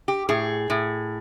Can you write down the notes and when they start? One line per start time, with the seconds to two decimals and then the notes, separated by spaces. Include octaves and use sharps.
0.08 G4
0.29 A2 G#4
0.70 A2